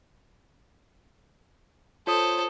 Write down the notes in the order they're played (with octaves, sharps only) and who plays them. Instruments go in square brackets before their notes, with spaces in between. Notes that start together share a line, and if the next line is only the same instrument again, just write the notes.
[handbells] F4 C#5 D#6 [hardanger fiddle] A4 C5